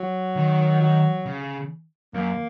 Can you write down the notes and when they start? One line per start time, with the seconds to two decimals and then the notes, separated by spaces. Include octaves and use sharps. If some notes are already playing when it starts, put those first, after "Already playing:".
Already playing: F#3
0.36 D#3
0.81 F#3
1.26 C#3
2.14 F#2 A#3